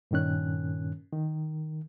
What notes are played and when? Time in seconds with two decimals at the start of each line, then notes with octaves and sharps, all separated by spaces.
0.11 G2 A#2 D#3 C#4 F#6
1.13 D#3